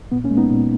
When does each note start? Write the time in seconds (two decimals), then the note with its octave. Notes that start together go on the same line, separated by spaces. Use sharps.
0.12 A#2 B3
0.24 A#3 C#4
0.30 G#3
0.37 B3 D#4
0.50 A#2